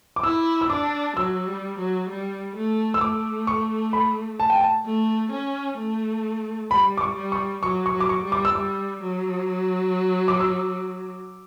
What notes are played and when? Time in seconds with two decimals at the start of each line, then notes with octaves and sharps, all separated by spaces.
0.16 D6
0.23 E4 E6
0.61 E6
0.70 D4 D6
1.16 F#3 E6
1.47 G3
1.78 F#3
2.09 G3
2.55 A3
2.94 E6
3.01 A3 D6
3.47 C#6
3.93 B5
4.40 A5
4.50 G5
4.61 A5
4.86 A3
5.32 C#4
5.78 A3
6.71 G3 B5
6.97 D6
7.01 C#6
7.16 G3
7.32 C#6
7.63 F#3 C#6
7.86 C#6
7.93 F#3
8.00 D6
8.09 C#6
8.25 G3
8.32 D6
8.45 E6
8.55 G3 D6
9.02 F#3
10.28 D6
10.40 E6